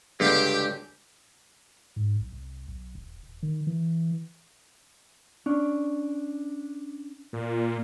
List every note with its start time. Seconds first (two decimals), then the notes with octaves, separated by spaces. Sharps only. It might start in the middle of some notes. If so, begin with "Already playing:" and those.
0.20 C#2 G2 D3 G#3 G4
1.96 G#2
2.20 B1
2.32 C2
2.68 B1
2.95 D#1
3.23 D#1
3.43 D#3
3.67 E3
5.46 C#4 D4
7.33 A#2